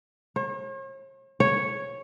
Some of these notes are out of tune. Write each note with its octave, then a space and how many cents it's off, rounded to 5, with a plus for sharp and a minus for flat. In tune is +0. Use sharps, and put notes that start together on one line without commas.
C#5 -45
C#5 -5